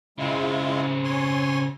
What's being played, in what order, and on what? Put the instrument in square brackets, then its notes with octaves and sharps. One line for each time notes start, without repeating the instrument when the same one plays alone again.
[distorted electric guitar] C#3 C4 [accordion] G#3 E4 F4
[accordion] C#5 G#5 C6